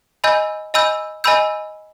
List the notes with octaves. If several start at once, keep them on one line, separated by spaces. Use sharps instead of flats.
D#5 G#5 B5 E6 G6
D#5 G#5 B5 E6 G6
D#5 G#5 B5 E6 G6